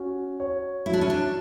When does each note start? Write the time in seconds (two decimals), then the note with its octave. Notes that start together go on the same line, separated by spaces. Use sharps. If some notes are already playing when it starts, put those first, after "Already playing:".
Already playing: C#4 F#4
0.40 C#5
0.86 F#3 E4
0.93 D4
1.01 C#4
1.10 D4